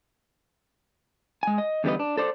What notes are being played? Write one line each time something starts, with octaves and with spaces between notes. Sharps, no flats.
G#3 G#5
D#5
E2 D3 G3 B4 D#5
D4
A4 C5 D5